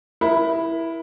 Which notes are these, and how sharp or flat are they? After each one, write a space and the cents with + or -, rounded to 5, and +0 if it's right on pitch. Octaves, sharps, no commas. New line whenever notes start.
E4 +0 A#4 +35